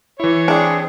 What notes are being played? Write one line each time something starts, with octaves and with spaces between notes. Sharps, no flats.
E3 E4 C#5
C4 D4 G#4